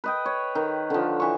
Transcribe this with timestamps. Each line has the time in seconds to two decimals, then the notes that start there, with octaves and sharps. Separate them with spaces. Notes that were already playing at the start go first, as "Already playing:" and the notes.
0.04 B4 D#5 G5
0.25 C#5
0.55 D#3
0.90 D3 F3
1.20 E3 C#6